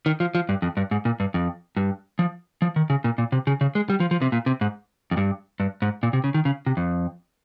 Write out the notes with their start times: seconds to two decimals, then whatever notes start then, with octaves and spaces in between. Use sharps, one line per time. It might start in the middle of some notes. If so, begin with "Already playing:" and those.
0.06 D#3
0.20 F3
0.35 F3
0.49 G2
0.62 F2
0.77 G2
0.91 G#2
1.05 A#2
1.20 G2
1.34 F2
1.77 G2
2.19 F3
2.62 F3
2.76 D#3
2.90 C#3
3.04 A#2
3.18 A#2
3.32 C3
3.47 C#3
3.61 C#3
3.75 G#3
3.90 G3
4.00 F3
4.11 F3
4.22 C3
4.32 A#2
4.46 C3
4.61 G#2
5.11 F2
5.17 G2
5.60 G2
5.82 G#2
6.03 A#2
6.13 C3
6.24 C#3
6.34 D#3
6.45 C#3
6.66 C3
6.77 F2